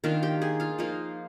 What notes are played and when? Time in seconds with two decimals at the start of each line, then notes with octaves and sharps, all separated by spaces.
0.04 D#3 A#3 D4 F4 F5
0.23 G4 G5
0.42 G#4 G#5
0.60 F4 F5
0.78 F3 A#3 D#4 F4 F5